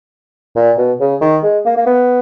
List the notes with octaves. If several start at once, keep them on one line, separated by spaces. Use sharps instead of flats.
A#2
B2
C#3
D#3
G#3
A#3
A#3
B3